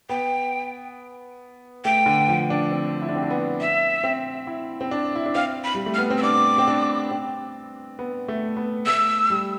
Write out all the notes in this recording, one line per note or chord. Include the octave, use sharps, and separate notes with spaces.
B3 G5
A3 G5
D3
F3
D4
C4
E4
D4
C4
D4
B3
E5
C4
E4
C4
D4
E4
D4
C4 F5
B5
G3
A3
F6
B3
C4
E6
D4 D6
C4
D4
C4
B3
A3
B3
A3 E6
G3